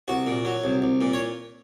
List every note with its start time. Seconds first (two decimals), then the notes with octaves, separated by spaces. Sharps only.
0.08 C2 F#4
0.27 A#2
0.45 F#3
0.64 C2
0.82 C2
1.01 A#2
1.13 C#5